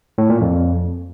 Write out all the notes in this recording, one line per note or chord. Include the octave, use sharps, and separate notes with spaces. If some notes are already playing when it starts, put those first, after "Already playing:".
A2
A#2
F2